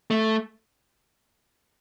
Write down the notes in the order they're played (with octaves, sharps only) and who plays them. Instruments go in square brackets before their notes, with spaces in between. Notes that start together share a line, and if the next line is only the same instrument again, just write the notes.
[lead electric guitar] A3